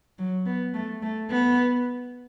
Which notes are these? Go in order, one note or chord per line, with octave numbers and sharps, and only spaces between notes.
F#3
B3
A3
A3
B3